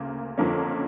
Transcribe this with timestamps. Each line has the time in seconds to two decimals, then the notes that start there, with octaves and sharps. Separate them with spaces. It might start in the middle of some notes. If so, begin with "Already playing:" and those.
Already playing: D2 C#3 A#3
0.38 F2 D3 F3 A#3 C#4